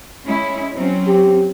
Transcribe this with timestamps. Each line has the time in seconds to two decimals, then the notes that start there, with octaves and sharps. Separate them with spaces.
0.25 G#3 C#4 E4
0.74 F#3 C4 C#4
1.07 G4